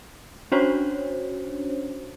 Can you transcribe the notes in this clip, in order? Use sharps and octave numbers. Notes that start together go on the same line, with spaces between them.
C#4 D4 F#4 C5 C#5